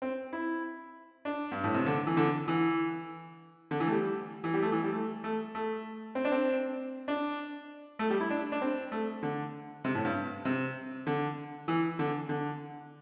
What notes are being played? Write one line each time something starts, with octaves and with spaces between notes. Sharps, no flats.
C4
E4
D4
G2
A2
C3
D3
E3
D3
E3
D3
E3
A3
G3
E3
G3
A3
E3
G3
A3
A3
A3
C4
D4
C4
D4
A3
G3
E4
D4
D4
C4
A3
D3
C3
A2
G2
C3
D3
E3
D3
D3